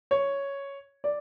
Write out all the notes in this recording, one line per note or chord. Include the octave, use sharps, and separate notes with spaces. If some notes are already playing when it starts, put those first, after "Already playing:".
C#5
D5